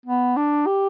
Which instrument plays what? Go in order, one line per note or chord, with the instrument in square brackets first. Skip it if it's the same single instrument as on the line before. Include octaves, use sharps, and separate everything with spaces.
[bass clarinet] B3
D4
G4